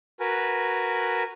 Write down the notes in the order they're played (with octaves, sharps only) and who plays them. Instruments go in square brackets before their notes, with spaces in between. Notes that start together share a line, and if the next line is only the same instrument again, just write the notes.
[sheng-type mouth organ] F#4 A#4 B4 G#5